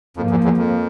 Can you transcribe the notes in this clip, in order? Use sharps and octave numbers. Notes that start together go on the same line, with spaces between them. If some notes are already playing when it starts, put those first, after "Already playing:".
F2 G#2 F3 A#3
E2
E2
F2